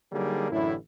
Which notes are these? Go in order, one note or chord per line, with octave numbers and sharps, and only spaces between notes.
D3 F#3 G3 A#3 D#4 G#4
A1 F#2 A2 D3 E4